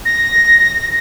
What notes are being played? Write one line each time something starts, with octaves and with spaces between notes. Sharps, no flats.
A#6